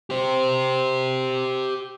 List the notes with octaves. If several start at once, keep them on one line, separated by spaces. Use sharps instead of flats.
G4 C5